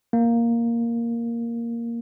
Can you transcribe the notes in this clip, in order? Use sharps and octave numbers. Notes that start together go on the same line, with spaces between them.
A#3